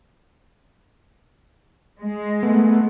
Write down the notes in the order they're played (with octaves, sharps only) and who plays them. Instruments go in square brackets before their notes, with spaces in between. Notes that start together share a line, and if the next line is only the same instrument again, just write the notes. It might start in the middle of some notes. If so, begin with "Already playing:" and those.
[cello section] G#3
[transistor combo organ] A3 B3